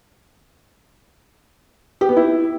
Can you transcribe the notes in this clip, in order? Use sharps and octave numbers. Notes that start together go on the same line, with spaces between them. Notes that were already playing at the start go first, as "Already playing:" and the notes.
G4
B3
E4